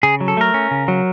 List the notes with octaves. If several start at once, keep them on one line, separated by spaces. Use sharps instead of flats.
C#3 G#4
F#3
A4
A3 A#4
C#4
C#3
F#3